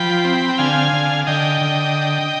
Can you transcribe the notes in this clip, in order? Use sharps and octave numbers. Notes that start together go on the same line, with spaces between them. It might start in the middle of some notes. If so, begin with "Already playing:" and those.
Already playing: F3 G5 B5
C4
G5
D3 F5 G#5
D3
D3 D#5 G5
D3